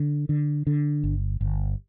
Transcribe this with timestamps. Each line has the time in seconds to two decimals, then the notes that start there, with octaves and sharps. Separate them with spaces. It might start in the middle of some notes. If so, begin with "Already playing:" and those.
Already playing: D3
0.29 D3
0.67 D3
1.04 G1
1.41 G1